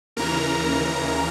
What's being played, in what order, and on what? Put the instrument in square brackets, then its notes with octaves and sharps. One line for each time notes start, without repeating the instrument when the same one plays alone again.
[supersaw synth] D#2 C#3 E3 A#4 A#5